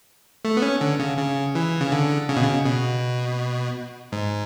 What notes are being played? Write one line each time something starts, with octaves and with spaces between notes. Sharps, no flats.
A3
B3
C#4
D3
C#3
C#3
E3
C#3
D3
C#3
B2
C#3
B2
G#2